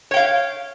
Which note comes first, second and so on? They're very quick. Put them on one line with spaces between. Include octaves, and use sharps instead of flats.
C#5 G5 F5